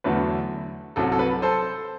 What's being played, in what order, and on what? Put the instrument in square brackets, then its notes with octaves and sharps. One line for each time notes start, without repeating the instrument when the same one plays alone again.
[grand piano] E2 D3 F#3 A3 B4
C2 C3 F#3 A4
A4
B4
A4 C5